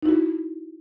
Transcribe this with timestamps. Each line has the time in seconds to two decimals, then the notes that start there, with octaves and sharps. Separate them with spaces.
0.02 D#4
0.06 E4
0.09 F#4